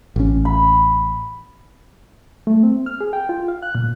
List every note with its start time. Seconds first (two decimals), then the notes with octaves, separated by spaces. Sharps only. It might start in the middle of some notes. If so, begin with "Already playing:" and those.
0.16 A1 C#4
0.45 B5
2.47 A3
2.63 C4
2.86 F6
3.01 G#4
3.13 G5
3.29 F4
3.48 F5
3.62 F#6
3.75 A#2